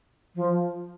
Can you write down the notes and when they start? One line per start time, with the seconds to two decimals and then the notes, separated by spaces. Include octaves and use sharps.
0.36 F3